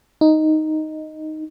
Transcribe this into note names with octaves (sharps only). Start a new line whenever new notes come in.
D#4